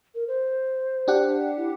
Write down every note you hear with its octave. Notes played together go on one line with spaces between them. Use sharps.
A#4
C5
D4 G4 F#5
E4